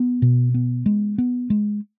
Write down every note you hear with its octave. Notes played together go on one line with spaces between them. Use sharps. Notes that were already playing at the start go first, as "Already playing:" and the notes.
Already playing: B3
B2
B3
G#3
B3
G#3